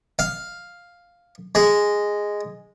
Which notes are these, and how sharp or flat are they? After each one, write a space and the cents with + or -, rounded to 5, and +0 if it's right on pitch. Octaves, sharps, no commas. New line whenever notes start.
F5 +5
G#3 -5